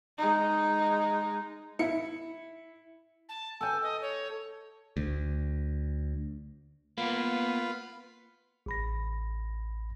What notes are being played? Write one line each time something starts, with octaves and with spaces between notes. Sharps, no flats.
G#3 D#4
E4 C#7
A5
A4 G5 G#5
D#5
C#5
D2
A#3 B3 F4 B4
A1 B5 A#6